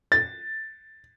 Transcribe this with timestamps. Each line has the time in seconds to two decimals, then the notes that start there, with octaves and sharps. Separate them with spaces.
0.12 A6